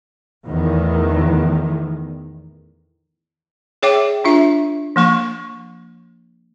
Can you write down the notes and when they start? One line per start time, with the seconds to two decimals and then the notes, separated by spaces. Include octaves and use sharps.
0.46 E2 A2 D#3
3.82 G#4 C#5 E5 G5 D6
4.24 D4 F4 E5
4.96 F3 A#3 C#6